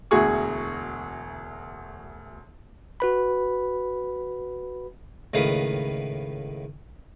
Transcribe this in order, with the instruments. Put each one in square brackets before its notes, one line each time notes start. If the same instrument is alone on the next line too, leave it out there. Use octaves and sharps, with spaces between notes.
[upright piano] E1 D2 E4 F#4 G#4 C#6
[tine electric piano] F#4 B4 B5
[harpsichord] C#2 A2 D#3 B4 F5 D#6